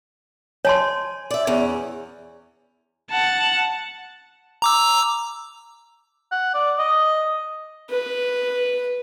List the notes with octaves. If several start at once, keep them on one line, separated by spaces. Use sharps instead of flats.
C#5 G#5 A5 C6
D5 E5
E2 C#4
F#5 A5
A#5 D6 E6
F#5
D5
D#5
B4